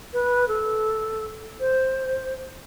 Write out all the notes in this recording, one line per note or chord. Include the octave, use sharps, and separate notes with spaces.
B4
A4
C5